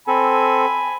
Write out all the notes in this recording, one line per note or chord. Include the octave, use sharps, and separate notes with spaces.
C4 A4 G#5 B5